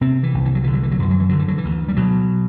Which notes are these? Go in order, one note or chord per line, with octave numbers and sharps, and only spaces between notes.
C3 C4
E3
C2
E3
F#3
D3 E3
F#3
E3
F#3
F#2 E3
F#3
E3
D3 F#3
E3
F#3
E3
D2
G3
B2 F#3